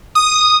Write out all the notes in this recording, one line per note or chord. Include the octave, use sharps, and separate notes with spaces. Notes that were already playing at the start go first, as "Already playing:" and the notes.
D#6